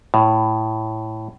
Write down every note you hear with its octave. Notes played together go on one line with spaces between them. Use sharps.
A2